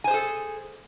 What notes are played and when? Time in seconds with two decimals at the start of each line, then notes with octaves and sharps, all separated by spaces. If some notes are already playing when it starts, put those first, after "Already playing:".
0.04 G#5
0.07 C5
0.11 G#4
0.14 A4